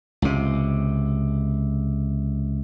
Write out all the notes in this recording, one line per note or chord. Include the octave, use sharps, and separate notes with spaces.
C#2 C3